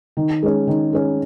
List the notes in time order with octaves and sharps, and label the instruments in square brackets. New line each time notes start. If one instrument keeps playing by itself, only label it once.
[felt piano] D#3
G#3 C#4
D#3
G#3 C#4